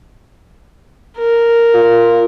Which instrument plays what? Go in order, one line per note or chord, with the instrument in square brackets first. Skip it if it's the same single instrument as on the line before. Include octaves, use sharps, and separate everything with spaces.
[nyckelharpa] A#4
[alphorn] F4